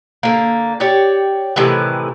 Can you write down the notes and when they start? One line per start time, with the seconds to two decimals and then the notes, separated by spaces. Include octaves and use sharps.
0.23 D3 A#3
0.80 G4 C#5 D5
1.56 A2 C3 D#3 E3